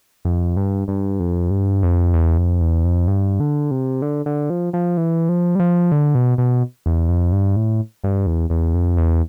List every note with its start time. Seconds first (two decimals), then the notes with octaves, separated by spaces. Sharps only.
0.25 F2
0.57 G2
0.88 G2
1.20 F2
1.50 G2
1.83 F2
2.14 E2
2.37 F2
2.61 E2
2.85 F2
3.08 G2
3.40 D3
3.71 C3
4.02 D3
4.26 D3
4.50 F3
4.73 F3
4.97 E3
5.29 F3
5.55 G3
5.59 F3
5.92 D3
6.15 B2
6.38 B2
6.86 E2
7.09 F2
7.32 G2
7.56 A2
8.04 G2
8.27 E2
8.50 E2
8.74 F2
8.97 E2